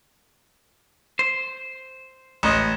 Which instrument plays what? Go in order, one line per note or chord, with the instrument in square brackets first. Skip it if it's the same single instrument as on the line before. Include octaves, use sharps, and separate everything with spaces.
[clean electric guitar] C5
[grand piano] A1 D#5